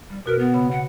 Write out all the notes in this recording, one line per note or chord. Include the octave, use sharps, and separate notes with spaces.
G3
B2 F#4 A#4 B4
B3
C#3 B5
F#5